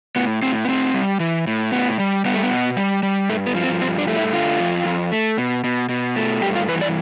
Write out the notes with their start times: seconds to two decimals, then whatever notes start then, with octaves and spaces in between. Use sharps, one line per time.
0.16 A2 B3
0.42 A2 C4
0.65 B3
0.68 A2 C4
0.94 G3
1.20 E3
1.47 A2
1.72 A2 B3
1.99 G3
2.25 G3 B3
2.34 A3
2.43 B3
2.51 B2
2.77 G3
3.03 G3
3.29 G2 A3
3.46 B3
3.54 F3
3.64 C4
3.81 G2 C4
3.98 D4
4.08 A3
4.16 E4
4.33 D3 F4
4.60 F2
4.85 F2
5.12 A3
5.38 B2
5.64 B2
5.89 B2
6.16 A3
6.41 G2 G4
6.55 F4
6.68 E3 B4
6.81 D5